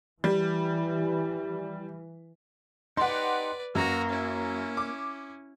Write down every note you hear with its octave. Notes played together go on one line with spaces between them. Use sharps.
E3 G3
D#4 G4 B4 D5 F#5 C6
F#2 A#3 F#4 A#5
C#4 E4
D6